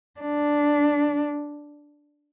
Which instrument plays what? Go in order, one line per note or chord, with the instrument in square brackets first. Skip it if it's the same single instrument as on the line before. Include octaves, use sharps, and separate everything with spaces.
[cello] D4